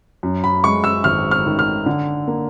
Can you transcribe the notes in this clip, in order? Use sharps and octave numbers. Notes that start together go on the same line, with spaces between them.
F#2
B5
G#3 C#6
E6
G#1 F6
F6
D#3
F6
D3
A#3